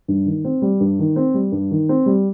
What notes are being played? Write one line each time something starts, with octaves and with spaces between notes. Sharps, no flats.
G2
D#3
C4
G3
G2
D#3
C4
G3
G2
D#3
C4
G3